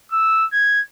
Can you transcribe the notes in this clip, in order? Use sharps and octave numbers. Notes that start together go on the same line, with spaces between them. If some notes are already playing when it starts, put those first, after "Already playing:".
E6
G#6